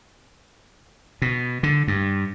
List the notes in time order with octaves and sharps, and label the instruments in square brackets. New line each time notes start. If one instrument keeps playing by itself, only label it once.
[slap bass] B2
D3
G2